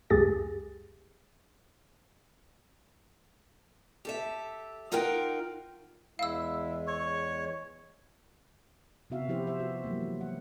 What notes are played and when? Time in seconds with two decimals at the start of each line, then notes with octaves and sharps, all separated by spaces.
0.10 C#2 F#2 G4 G#4 A6 A#6
4.05 G4 A4 E5
4.92 D#4 F4 A#4 F#5 G5
6.19 E2 G#3 E4 F5 E6
6.87 C#5 C#6
9.10 C3 B3 F#4 E5 F5
9.29 F3 E4 G4 C5
9.47 B3 C5 E5
9.60 F#4
9.84 E3 F#3 G#3 A#3
10.21 F#5